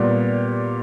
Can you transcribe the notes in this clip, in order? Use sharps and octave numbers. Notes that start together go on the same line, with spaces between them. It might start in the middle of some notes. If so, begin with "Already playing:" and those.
Already playing: A#2 G3 B3